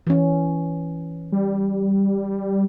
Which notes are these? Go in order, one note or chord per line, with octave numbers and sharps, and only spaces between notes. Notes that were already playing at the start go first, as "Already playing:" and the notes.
E3 C#4
G3